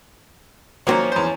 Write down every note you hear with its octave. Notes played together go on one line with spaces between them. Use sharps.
D#3 F3 F#3 A#3 C4 C#4
E2 C5